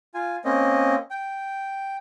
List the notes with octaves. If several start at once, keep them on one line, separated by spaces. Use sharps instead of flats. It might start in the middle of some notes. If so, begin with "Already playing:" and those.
F4 G#5
A#3 C4 C#4 D#5
G5